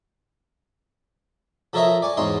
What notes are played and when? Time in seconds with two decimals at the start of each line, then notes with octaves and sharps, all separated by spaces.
1.73 F3 A4 A#4 C#5 D#5 E5
2.02 D5 G#5 C#6
2.17 E2 G#2 G#3 D#4 C#5 C6